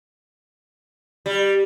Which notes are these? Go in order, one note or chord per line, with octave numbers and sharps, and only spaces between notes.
G3